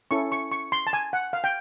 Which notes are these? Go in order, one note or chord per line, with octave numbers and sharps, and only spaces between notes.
C#4 E4 A4 C#6
C#6
C#6
C6
A5
G#5
F#5
F5
G5